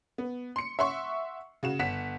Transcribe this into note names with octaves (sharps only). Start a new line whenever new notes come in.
B3
C6 C#7
E5 F#5 C6 C#6
C#3 F#4 E7
G1 F#5 B6 E7